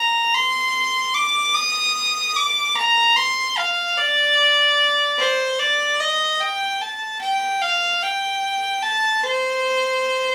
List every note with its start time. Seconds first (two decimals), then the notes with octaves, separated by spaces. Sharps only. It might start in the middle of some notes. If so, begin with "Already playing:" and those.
Already playing: A#5
0.34 C6
1.15 D6
1.55 D#6
2.36 D6
2.76 A#5
3.17 C6
3.58 F5
3.98 D5
5.19 C5
5.59 D5
6.00 D#5
6.40 G5
6.81 A5
7.21 G5
7.62 F5
8.02 G5
8.83 A5
9.23 C5